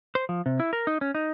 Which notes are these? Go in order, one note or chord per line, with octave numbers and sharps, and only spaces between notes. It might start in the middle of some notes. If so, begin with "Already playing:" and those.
C5
F3
C3
E4
A#4
D#4
C#4
D#4